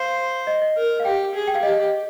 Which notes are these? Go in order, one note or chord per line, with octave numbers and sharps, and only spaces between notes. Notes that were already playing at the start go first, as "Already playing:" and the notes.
Already playing: C5 F5
D#5
D#5
A#4
F5
G4 G5
G#4
G5
F5
G4 D#5